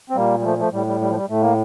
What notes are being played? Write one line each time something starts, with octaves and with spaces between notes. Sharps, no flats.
C4
A#2 G3 A#3
G3
F3 A3
F3 A3
A2 G3
G3
G3
F3
G3
A2 A3
A#3